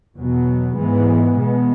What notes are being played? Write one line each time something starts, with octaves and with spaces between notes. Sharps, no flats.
E2 B2 F#3 B3
G#2 E3 G#3 B3
B2 G#3 B3